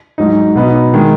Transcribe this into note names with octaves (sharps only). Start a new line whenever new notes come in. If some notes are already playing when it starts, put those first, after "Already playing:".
G#2 F#3 D#4
B2 B3 D#4
D#3 G#3